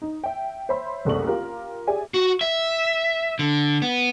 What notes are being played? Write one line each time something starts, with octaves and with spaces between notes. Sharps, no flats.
D#4
E5 G5
C5 C#5 E5 B5 C6
F#1 C2 A3 D5 C#6 F#7
F4 G4 A#4
G4 G#4 D5 E5 G#5
F#4
E5
D3
B3